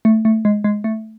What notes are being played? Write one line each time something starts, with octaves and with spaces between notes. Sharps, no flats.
A3
A3
G#3
G#3
A3